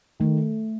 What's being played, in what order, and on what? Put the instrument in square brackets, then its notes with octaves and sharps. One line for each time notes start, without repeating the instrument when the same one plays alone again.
[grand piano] D#3 [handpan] A3